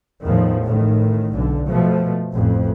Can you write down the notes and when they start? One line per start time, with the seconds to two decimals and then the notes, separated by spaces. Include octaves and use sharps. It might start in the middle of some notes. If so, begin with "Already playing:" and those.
0.24 E2 A2 D#3 F3
0.66 A1 A2 D#3
1.35 F#1 B1 D3
1.69 B2 F3 A3
2.33 A1 F2